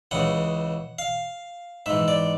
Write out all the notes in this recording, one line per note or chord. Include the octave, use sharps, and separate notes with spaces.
C#2 C#3 E3 F#5
F5
G#2 E3 E5
D5